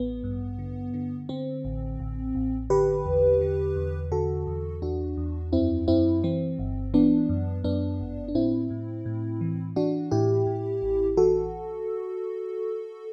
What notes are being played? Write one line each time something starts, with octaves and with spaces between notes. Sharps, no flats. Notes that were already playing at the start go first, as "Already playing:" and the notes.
Already playing: A1 B3
G2
D3
D3
D3 C4
A1
A1
A1
D3 G4 B4
E2
D3
E2
D3 F#4 A4
E2
E2 D4 F#4
E2
F#2 C4 E4
F#2 C4 E4
E3 C4
G1
E3 B3 D4
F#2
F#2 B3 D4
G1
D4
A2 C4 E4
A2
A2
E3
E3 D4 F#4
A2 E4 G4
A2
A1
E3 F#4 A4